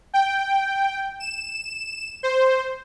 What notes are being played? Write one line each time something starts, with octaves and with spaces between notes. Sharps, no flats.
G5
E7
C5